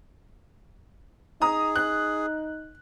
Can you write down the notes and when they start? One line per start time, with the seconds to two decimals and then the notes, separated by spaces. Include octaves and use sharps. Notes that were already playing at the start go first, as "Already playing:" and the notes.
1.42 D#4 G#4 A#5 D#6
1.76 F#6